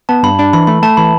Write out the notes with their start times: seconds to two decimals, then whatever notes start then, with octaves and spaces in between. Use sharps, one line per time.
0.09 B3 A5
0.23 G2 B5
0.39 D4 B5
0.53 E3 B5
0.67 A3 B5
0.82 A3 A5
0.97 E3 B5